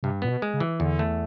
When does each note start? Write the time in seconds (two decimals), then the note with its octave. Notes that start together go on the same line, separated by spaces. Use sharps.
0.03 G2 C3
0.22 A#2 B3
0.29 B2
0.42 G#3
0.54 C#3
0.60 E3
0.80 E2 D3
0.99 A3